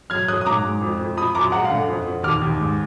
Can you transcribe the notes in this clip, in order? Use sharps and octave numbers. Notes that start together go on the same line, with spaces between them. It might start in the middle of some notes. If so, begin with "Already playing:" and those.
F#3 F6 G#6
F#3 D#6 F#6
D#6
G#2 A#5 D6
G#2
F2
F2
F3 B5 D#6
F#2 A#5 D6
G#3 F#5 A#5
F5
D3 F#5
F2
F2
D#2 D6 F6
D#2
G#2